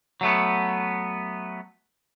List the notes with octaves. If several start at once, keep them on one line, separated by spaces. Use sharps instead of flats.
F#3 A3 B3